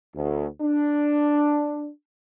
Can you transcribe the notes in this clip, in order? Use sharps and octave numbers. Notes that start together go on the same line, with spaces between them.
D2
D4